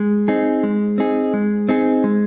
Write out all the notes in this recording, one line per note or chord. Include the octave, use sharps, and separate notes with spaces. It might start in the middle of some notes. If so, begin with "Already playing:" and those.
Already playing: G#3
C4 D#4 G#4
G#3
C4 D#4 G#4
G#3
C4 D#4 G#4
G#3